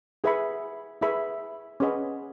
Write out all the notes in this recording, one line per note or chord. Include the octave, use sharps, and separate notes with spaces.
E4 G#4 B4 E5 B5
E4 G#4 B4 E5 B5
C#4 G#4 B4 D#5 F#5